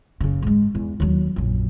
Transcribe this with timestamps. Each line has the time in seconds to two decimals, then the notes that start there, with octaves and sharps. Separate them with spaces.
0.21 F#1 C#3
0.42 G#2 G#3
0.75 E2
1.00 D#2 F#3
1.36 A#1 F#2